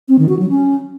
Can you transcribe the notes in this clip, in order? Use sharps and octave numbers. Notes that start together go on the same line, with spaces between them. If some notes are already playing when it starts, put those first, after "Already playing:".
C4
D#3
F#4
F#3
C#4